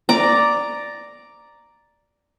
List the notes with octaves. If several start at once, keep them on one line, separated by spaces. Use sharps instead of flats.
D5 A#5